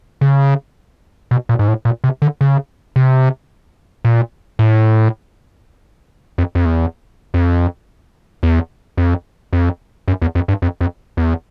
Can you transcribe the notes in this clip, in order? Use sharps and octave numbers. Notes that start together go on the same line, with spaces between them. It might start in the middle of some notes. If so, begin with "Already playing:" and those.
C#3
B2
A#2
G#2
A2
A#2
C3
D3
C#3
C3
A#2
A2
F2
F2
E2
F2
E2
F2
F2
F#2
E2
F2
G2
F2
F2
E2